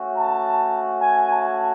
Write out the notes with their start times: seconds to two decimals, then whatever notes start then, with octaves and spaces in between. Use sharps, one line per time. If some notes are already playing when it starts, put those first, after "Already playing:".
Already playing: A3 C#4 F#4
0.15 A5
1.00 G#5
1.29 A5